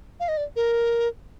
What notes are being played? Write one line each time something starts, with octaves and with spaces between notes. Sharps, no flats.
F5
D#5
D5
A#4